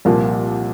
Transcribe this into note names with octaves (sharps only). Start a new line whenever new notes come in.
C2 A#2 F3 A#3